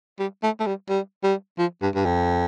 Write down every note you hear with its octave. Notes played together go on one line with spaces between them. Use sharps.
G3
A3
A3
G3
G3
G3
F3
G2
G2
F2